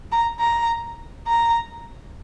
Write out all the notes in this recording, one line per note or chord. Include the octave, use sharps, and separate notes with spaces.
A#5
A#5
A#5